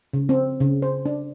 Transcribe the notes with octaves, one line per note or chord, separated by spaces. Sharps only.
C#3
C4
C#3
C5
D4